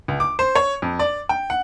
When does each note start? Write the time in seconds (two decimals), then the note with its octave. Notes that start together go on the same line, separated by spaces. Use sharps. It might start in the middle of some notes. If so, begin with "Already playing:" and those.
0.08 C#2
0.20 D6
0.39 C5
0.55 C#5
0.82 F2
0.99 D5
1.29 G5
1.50 F#5